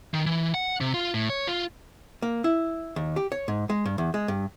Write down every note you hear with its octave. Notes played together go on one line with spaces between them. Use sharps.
D#3
E3
F#5
C3
F4
A2
C#5
F4
A#3
E4
D#2
G4
C#5
G#2
G#3
G2
E2
G#3
G2